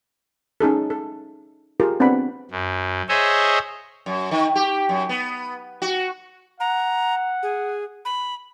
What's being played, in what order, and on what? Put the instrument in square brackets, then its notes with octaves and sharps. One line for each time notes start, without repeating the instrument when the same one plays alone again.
[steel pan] C#4 D#4 G#4 A4
A4
F4 G4 G#4 A#4
B3 C4 D4 B4 F#5 B5
[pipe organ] F#2
G#4 C5 C#5 D#5 E5
[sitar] F#2
D#3
G4
F#2
B3
F#4
[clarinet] F#5 [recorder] A#5
[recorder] G#4
B5